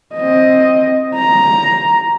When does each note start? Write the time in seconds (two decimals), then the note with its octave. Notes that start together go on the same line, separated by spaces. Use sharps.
0.16 C4 D#5
1.15 A#5